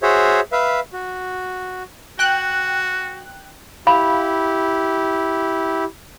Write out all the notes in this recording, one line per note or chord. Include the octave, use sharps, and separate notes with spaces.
F#4 G#4 C5 C#5 E5
B4 E5 F5
F#4
F#4 G5 F#6
E4 G4 F5 B5